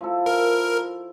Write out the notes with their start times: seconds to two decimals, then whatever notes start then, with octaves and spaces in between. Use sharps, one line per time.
0.01 F3 E4 A4
0.26 A#4